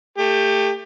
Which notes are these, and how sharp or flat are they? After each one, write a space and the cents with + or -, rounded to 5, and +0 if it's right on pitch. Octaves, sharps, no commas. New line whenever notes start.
A3 +20 G4 +20